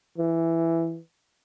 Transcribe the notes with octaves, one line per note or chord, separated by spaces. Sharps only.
E3